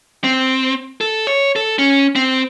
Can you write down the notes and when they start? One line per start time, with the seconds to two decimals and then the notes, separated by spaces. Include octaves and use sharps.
0.24 C4
1.01 A4
1.27 C#5
1.56 A4
1.79 C#4
2.16 C4